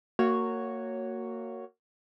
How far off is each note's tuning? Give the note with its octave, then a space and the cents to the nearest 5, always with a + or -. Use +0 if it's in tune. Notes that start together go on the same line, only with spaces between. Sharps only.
A#3 -20 F#4 +0 C#5 +0